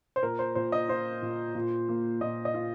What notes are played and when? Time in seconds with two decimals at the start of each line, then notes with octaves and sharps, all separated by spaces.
0.16 C5
0.23 A#2 A#4
0.39 C5
0.55 A#2 C5
0.72 D#5
0.89 F4 C5
1.22 A#2
1.55 A#2
1.89 A#3
2.21 A#2 D#5
2.45 D#5
2.54 F4